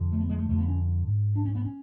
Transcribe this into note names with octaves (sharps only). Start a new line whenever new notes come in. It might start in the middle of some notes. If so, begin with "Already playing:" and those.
Already playing: F2 D3
A3
B3
G#3
A3
F2 D3 A3
B3
C#4
G#2
D4
C#4
B3
C#4